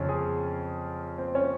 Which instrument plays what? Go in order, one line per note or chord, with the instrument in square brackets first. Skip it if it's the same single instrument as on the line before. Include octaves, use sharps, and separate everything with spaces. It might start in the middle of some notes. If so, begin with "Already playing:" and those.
Already playing: [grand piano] F2 C#3 F3 C#4
G#4
C4
C#4